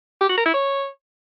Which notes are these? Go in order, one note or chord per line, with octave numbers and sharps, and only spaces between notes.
G4
F#4
A#4
E4
C#5